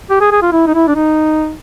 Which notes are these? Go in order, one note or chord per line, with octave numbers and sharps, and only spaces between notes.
G4
G#4
G#4
F4
E4
D#4
E4
D4
D#4